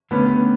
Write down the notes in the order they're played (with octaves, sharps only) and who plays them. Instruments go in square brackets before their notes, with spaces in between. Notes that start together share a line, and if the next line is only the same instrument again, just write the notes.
[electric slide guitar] D3 A3 C#4 G4 B4 [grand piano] B3